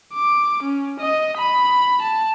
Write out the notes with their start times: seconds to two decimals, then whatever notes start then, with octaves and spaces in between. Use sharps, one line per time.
0.14 D6
0.63 C#4
1.00 D#5
1.38 B5
2.02 A5